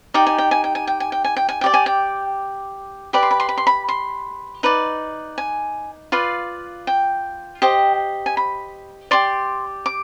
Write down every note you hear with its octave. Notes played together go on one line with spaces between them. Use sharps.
D#4 G4 D5 G5
G#5
G5
G#5
G5
G#5
G5
G#5
G5
G#5
G5
G#5
G4 D5 G5
G#5
G5
G4 B4 D5 B5
C6
B5
C6
B5
C6
B5
C6
D#4 B4 D5
G#5
F4 B4 D5 F5
G5
G4 C5 D#5
G#5
B5
G4 D5 C6
D6